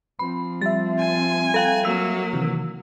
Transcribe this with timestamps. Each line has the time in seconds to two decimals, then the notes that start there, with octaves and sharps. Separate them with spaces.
0.19 F3 C4 B5
0.61 G3 E5 A6
0.99 G#5
1.54 A4 F5 G5
1.85 F#3 A#3 E6
2.33 C3 D#3 E3